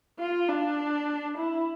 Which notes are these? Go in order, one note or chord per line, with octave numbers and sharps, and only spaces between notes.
F4
D4
E4